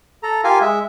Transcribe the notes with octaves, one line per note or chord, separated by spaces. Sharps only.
A4 A#5
F4 G4 A#4 F5 G#5
G#3 E5